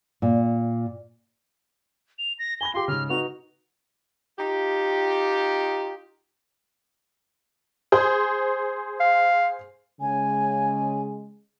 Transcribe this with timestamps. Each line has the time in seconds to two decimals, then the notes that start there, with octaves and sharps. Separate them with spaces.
0.22 A#2
2.19 F7
2.39 A#6
2.61 G#5 B5 A#6 G7
2.74 F4 G4 C6
2.88 G#2 C#3 F6
3.09 D#4 F#4 B4 F7
4.38 D#4 F4 G4
7.92 G#4 C5
9.00 F5
10.01 C#3 G#3 G#5